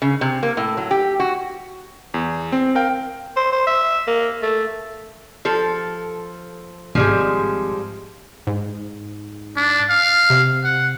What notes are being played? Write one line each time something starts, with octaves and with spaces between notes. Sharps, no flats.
C#3
C3
A#3
A2
F#3
G4
F#4
E2
C4
A#4 F5 G5
C5
C5
E5
A#3
A3
F3 A4
G#1 F3 G3 G#3
G#2
D4
F5
C3
F#5